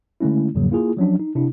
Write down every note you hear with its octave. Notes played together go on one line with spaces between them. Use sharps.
D3 G#3 A3 C#4 E4
E2 G#2 C#3 F3 F#3 A#3
A#3 E4 F4 G#4
F3 F#3 C#4 D4
D#4
C3 D4 E4